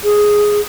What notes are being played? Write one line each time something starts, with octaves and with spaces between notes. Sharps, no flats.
G#4